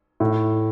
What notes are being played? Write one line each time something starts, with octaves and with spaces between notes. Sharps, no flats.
A2